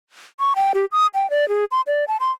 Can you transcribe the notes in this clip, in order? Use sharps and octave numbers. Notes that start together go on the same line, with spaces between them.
C#6
G5
G4
D#6
G5
D5
G#4
C6
D5
A5
C6